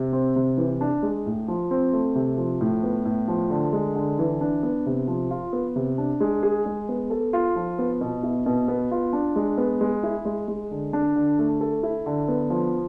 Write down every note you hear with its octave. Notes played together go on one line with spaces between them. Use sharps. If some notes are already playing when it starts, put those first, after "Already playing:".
Already playing: C3
C4
C3
E3
D4
G#3
A2
F3
C4
A3
C3
F3
A2
B3
A2
F3
D3
G#3
D3
E3
D4
B3
C3
F3
F4
B3
C3
D4
G#3
G#4
G#3
B3
A4
F4
F3
B3
B2
E4
B2
B3
F4
D4
G#3
B3
G#3
E4
G#3
G#3
D3
D4
D3
A3
A4
E4
D3
B3
F3